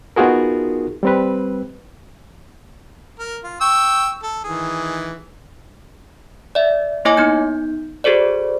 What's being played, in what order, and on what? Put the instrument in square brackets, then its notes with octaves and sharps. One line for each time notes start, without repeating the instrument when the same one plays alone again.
[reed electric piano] B3 D#4 F4 F#4 G#4 A#4
G3 C4 B4
[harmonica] A#4
F4
G5 C#6 E6
A4
D#3 E3 G#4
[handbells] D5 E5
A#3 E4 C#5 D#5 G#5 D6
B3 D#4 G6
F#4 G#4 A4 C5 D5